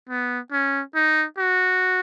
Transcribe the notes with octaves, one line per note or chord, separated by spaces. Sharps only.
B3
C#4
D#4
F#4